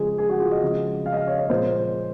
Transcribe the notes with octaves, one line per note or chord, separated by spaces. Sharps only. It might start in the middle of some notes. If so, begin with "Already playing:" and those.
Already playing: C#3 F3 G#3 G#4
G#4
F#4
F4
D#5
C#3 F3 G#3
F5
D#5
F5
C#5
C#5
A#2 F3 G#3 C5